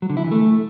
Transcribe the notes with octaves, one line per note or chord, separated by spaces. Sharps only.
F#3
D3
E4
E3
A3